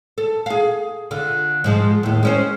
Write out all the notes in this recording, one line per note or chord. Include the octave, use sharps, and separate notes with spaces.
A4
G#4 F5
D3 F4
G#2 F3 G#3
D#2 A2
G#3 C#4 C5